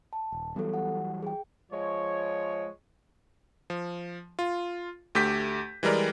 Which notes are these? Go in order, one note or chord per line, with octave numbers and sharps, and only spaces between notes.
A5
D#1
E3 F#3 G3 B3 A4
F#5
G#4 G5
F3 G#3 C#5
F3
F4
D2 A3 G4 G6 B6
E3 G3 G#3 A#4 D5